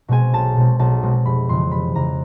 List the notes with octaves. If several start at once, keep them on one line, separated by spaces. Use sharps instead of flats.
B2 G#3 C4 G#5
B1 A5
B2 G#3 C4
B1 A5
B2 G#3 C4
F1 B5
F2 C#3 E3 C6
F1 B5
F2 C#3 E3 A#5